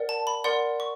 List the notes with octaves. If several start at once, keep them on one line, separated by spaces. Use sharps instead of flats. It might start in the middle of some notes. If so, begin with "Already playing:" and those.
Already playing: A#4 D5 F#5
A5
B5
A#4 D5 F#5 C6
C#6